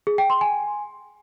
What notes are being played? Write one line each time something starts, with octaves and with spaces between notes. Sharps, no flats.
G#4
G5
C6
G#5